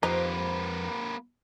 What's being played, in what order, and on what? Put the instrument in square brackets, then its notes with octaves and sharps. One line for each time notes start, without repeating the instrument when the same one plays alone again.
[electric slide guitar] F2 [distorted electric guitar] A#3 B4 [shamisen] D#4 [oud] F4 G4 C5